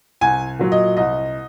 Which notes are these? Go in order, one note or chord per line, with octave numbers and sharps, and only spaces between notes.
C2 G#5
A#2 F#3
D#5
C2 D#5